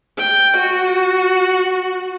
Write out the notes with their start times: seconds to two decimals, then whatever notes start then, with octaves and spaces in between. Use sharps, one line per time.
0.18 G5
0.57 F#4